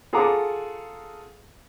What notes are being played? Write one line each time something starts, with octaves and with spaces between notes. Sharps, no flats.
F4 G#4 A4 F#5 A#5 D6